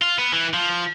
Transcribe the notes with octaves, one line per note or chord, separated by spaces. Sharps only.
F4
B3
E3
F3